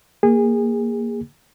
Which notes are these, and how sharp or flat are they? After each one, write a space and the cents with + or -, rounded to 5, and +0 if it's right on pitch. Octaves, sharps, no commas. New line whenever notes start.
A#3 +0 G#4 -25